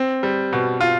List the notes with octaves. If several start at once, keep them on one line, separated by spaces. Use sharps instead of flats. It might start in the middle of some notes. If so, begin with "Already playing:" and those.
Already playing: C4
G3
B2
F4